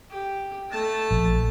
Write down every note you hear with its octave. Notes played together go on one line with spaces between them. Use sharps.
G4
A3 A5
A#1